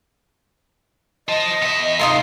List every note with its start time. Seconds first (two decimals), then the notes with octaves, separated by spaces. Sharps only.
1.28 C5 D#5 A5
1.62 B3 E5
2.00 C3 G#3 D#4 F4 C6